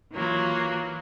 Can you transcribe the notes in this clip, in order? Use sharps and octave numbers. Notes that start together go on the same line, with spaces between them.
E3 F#3 A#3 F4